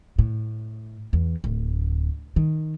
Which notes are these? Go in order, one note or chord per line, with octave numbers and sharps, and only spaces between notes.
A2
E2
D1
D#3